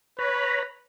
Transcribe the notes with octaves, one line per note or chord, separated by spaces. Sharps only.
B4 C#5 A#5 B5